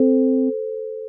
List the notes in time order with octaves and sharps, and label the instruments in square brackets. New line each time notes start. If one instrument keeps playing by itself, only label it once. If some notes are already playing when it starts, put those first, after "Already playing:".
Already playing: [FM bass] C4 [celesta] A4 C5